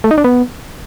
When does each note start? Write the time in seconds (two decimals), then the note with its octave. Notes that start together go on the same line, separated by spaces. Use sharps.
0.04 A3
0.11 D#4
0.18 D4
0.24 B3